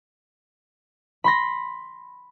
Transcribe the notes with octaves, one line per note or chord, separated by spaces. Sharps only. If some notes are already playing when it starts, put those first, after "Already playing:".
B5 C6 A#6